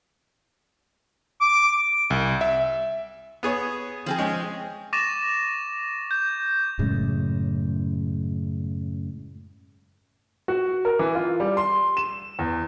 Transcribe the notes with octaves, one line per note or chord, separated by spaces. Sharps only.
D6
C2
E5
B3 G#4 C#5
F3 C4 G#4
G#3 C#4
C#6 D6 A6 A#6 D#7 E7
G6
F#2 A2 C#3 G#3
F#4
A#4
E3
F4
G3
C6
E7
E2